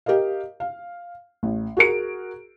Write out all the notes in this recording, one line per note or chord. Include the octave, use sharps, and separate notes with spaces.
G4 A#4 D#5 F5
F5
A1
F#4 G#4 A#4 D7